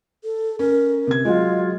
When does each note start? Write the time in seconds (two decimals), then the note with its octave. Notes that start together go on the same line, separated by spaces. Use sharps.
0.24 A4
0.59 C#4 A#4
1.07 C3 G#6
1.25 F#3 G#3 F4 D#5